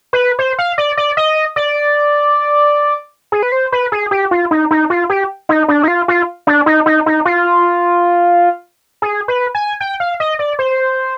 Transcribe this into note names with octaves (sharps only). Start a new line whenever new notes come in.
B4
C5
F5
D5
D5
D#5
D5
G#4
B4
C5
B4
G#4
G4
F4
D#4
D#4
F4
G4
D#4
D4
D#4
F4
F4
D4
D#4
D#4
D#4
F4
G#4
B4
G#5
G5
F5
D#5
D5
C5